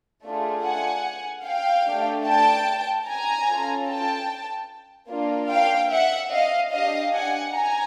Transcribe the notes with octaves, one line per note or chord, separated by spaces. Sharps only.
A3 D4 F4 G#4
F#5 G#5
F5 G5
A3 D4 G4
G5 A5
G#5 A#5
C#4 F4 A4
G5 A5
A#3 D4 F4
F5 G5
E5 F#5
D#5 F5
D4 G4 D#5 F5
F#5 G#5
G#5 A#5